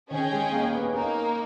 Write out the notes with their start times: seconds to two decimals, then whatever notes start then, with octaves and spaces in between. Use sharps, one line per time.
0.11 D#3 C#4 G#4 D#5 G5
0.31 G#3
0.52 A#3
0.62 A#3
0.73 B3
0.83 C#4
0.93 A#3 C#4 D#4 A#4